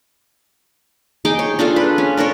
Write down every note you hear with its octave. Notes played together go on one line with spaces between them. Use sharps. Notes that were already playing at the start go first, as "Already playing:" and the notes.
D#4 G#4 G5 D6
C#5
D4 F4 G#4 A4
B4
C#4
D4 A4 A#4 C#5